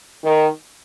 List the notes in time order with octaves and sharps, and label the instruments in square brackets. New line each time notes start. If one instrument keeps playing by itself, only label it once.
[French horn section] D#3